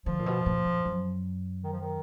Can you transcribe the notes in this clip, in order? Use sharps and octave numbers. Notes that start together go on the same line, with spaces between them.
D3 F3
A#2
B2
A#2
F2
F#2
D#3
F3
D#3